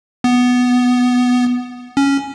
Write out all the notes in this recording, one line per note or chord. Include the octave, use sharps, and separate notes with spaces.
B3
C#4